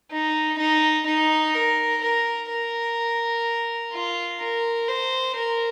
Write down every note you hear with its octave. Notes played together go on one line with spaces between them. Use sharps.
D#4
D#4
D#4
A#4
A#4
A#4
F4
A#4
C5
A#4